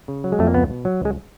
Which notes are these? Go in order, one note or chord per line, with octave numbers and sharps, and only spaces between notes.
C#3
F#3
G#3
F2 A3
A#3
C#2 B3
B2
F#3
C#2 G#3